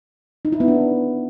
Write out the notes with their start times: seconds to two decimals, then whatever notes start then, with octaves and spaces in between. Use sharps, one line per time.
0.45 D#4
0.52 E4
0.60 B3
0.68 D4